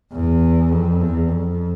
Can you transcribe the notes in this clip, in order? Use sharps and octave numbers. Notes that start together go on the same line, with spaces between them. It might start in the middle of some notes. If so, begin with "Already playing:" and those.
E2
F2
E2
F2